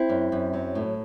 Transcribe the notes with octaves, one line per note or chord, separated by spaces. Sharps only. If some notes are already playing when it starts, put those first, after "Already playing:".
Already playing: C4 E4
F#2
F#2
F#3
A2